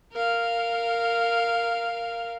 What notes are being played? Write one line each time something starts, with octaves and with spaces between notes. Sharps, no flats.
A#4 F5